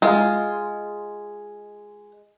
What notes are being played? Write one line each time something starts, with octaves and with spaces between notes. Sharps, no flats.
G#3 F4